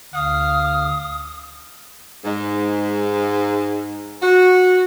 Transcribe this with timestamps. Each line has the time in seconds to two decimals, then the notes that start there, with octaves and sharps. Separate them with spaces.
0.14 D2 F5 D#6
2.24 G#2
4.22 F#4